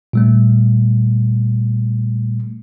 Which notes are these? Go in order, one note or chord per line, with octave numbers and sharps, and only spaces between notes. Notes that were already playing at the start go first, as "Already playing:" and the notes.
A#2 G3 A3